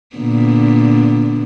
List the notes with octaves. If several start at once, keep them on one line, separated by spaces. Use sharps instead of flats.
A#2 D3 B3